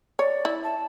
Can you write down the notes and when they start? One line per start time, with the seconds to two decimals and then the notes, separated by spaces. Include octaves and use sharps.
0.19 C#5 D5
0.45 E4
0.64 A5